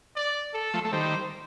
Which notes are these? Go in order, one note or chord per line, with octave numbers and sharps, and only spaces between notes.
D5
A4
F3 A3
A3
D#3 G3 C5